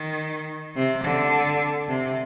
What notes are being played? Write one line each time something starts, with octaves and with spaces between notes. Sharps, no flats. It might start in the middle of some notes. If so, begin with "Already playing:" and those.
Already playing: D#3
C3
D3
C3